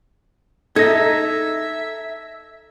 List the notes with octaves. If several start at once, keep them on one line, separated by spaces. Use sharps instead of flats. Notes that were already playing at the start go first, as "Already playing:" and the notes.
D#4 A4 E5 G#6 A#6